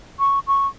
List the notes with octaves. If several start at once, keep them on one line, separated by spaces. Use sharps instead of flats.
C#6
C#6